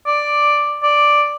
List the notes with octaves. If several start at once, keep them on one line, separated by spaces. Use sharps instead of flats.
D5
D5